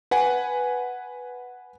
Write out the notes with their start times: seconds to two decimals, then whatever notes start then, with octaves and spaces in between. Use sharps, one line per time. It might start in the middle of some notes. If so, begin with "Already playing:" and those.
0.11 B4 F#5 G#5